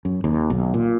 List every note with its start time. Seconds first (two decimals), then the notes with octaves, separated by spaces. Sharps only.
0.05 F#2
0.24 D#2
0.50 B1
0.74 A#2